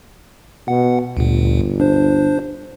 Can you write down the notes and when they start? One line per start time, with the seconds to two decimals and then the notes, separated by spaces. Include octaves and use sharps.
0.68 B2 F#5
1.17 G1 D2 A#2
1.80 D4 C5